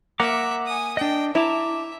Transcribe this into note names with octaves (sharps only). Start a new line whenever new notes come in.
A#3 E5 F#5 A#5 D6
G#5 D#6
D4 D#5 G5
E4 E5 A5 A#5 D6